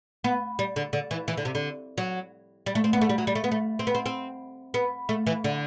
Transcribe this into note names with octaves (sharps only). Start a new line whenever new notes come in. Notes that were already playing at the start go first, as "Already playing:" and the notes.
B3
G3
D3
D3
E3
E3
D3
C3
D3
F#3
G3
A3
C4
B3
A3
G3
F#3
G3
A3
B3
A3
C4
B3
C4
C4
B3
A3
E3
D3